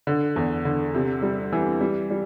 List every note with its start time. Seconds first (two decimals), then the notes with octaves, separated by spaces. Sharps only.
0.07 D3
0.36 E2
0.65 D3
0.95 C3
1.22 G3
1.53 E3
1.81 G3
2.11 G3